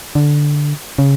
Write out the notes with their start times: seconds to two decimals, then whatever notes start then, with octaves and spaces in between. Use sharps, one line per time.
0.15 D3
0.98 C#3